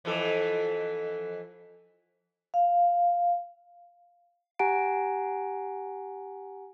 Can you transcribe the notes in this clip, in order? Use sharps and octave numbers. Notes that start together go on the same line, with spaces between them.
F2 E3 A4
F5
G4 F#5 G#5 A#5 D7